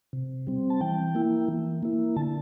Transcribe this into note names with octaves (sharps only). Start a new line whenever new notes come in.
C3
G3 C4
A5
E3 G5
A#3 E4
E3
A#3 E4
D3 A5